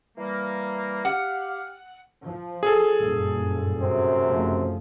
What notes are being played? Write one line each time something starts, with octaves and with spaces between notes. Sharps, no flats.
E3 G3 A#3
G4 F5 F#5
F3
G#4 A4
F#1 G2 A#2
F#2 C3 C4
F#1 F3 A3